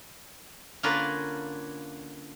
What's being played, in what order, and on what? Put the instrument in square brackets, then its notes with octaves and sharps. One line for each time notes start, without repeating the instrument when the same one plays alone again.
[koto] D3 A#3 C#4 F4 A#4 B4